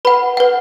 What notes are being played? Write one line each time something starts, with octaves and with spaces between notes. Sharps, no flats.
B4 F#5 B5
B4 F#5